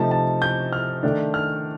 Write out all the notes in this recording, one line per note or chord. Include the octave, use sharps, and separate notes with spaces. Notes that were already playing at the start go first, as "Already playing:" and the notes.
Already playing: C3 F3 A3 D#4 A5
A5
G6
F6
D#3 A3 D4
F6